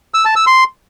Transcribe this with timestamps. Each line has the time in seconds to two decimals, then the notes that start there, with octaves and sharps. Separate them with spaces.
0.14 E6
0.25 A5
0.36 E6
0.47 C6